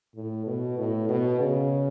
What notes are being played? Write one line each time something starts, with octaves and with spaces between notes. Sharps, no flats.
A2
B2
A2
B2
C#3